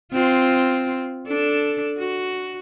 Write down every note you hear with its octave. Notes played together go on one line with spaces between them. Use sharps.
C4 F4
D4 A4
F#4